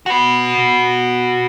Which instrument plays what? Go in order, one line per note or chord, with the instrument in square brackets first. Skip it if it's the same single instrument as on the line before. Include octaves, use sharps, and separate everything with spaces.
[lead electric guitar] F#4 B4